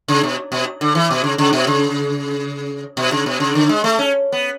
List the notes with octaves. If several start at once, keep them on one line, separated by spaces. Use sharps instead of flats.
C#3
B2
B2
D3
E3
B2
C#3
C#3
B2
C#3
B2
C#3
B2
C#3
D3
G#3
A3
C#4
B3